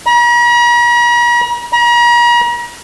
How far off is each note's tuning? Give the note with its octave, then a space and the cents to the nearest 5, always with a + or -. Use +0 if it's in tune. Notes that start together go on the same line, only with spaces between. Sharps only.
A#5 +45
A#5 +40